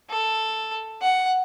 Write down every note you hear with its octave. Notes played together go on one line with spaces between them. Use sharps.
A4
F#5